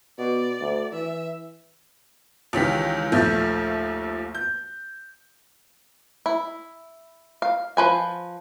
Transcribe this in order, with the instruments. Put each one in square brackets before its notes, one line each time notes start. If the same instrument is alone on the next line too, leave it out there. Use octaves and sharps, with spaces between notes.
[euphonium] B2 [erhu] D5
[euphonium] D2
[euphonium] E3 [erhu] E5
[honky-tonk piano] C#2 D#3 E3 C#4 G4 B6
A#1 D#2 F3 A3 E5 G6
G6
[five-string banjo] E4
F5
F3 B4 G#5